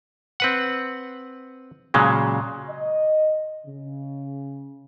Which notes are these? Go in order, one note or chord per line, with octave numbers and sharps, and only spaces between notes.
C4 B4 F#5
A#2 C#3 F#3 G#3
D#5
C#3